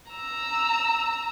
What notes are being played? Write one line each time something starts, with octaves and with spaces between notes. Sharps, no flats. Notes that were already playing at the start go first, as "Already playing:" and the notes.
A#5 E6